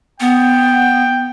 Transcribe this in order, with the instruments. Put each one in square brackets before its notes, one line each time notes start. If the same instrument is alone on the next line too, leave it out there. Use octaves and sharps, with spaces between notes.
[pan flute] B3 [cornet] G5